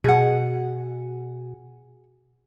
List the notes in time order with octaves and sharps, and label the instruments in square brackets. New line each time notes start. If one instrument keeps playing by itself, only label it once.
[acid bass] B2 [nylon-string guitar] G#4 F#5